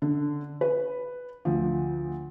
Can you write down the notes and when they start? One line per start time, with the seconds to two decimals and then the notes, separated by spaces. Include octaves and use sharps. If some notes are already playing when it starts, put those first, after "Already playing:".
0.02 D3
0.61 B4
1.45 D2 F3